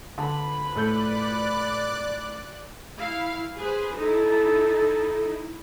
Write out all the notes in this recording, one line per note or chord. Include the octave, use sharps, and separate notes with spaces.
D3 F3 B4 A5 B5
A2 A4 D5 F#6 G6
E4 F5
G#4 B4 C5
D#4 E4 A4